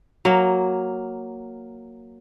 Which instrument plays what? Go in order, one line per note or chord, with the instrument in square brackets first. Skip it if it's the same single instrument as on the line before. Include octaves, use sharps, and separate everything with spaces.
[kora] F#3 A#3